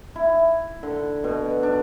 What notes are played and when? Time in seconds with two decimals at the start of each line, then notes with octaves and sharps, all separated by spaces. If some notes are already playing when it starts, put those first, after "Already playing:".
0.16 E4
0.83 D3
1.24 B2
1.63 D4